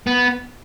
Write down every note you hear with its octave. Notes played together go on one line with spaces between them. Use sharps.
B3